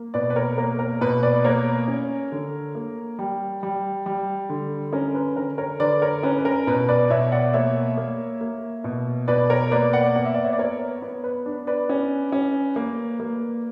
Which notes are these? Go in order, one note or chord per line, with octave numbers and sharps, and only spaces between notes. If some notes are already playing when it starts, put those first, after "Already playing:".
Already playing: A#3
B2 B4 D5
B4
A#4 C#5
A#3 A#4
A#4
B2 B4
B4 D5
A#3 A#4 C#5
C#4
D3
A#3
G3
G3
G3
D3
C#4 A#4
B4
D3 A#4
A#4 C#5
D3 B4 D5
A#4 C#5
C#4 B4
B4
A#4
B2 B4
B4 D5
B2 C#5 E5
D5 F#5
A#3 C#5 E5
A#3
A#3
B2
B2 B4 D5
A#4 C#5
A#3 B4 D5
D5 F#5
B3 F#5
E5
D5
C#5 E5
D5
B3 A#4 C#5
B3
B4
D4
B4 D5
C#4
C#4
A#3
A#3